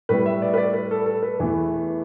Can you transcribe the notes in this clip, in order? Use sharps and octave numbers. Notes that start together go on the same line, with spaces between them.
A2 G3 B3 B4
E5
D5
B4
D5
B4
A4
A4
B4
E2 E3 A3